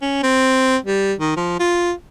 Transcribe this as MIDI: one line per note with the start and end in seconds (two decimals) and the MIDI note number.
0.02 0.19 61
0.23 0.77 60
0.85 1.13 55
1.19 1.33 51
1.36 1.59 53
1.59 1.92 65